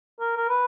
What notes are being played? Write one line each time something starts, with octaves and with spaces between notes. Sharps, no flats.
A#4
A#4
B4